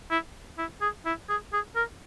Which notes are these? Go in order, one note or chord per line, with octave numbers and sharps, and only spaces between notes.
E4
E4
G#4
E4
G#4
G#4
A#4